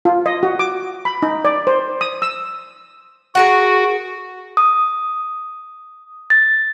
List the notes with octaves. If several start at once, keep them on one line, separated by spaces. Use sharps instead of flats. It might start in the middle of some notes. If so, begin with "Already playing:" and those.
F4
D#5
F#4
D6
B5
D#4
D5
C5
D#6
E6
F#4 G#4 A#4 F#5
D#6
A6